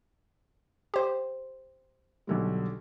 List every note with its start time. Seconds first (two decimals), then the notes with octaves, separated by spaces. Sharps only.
0.94 G4 C5
2.27 B1 D3 G3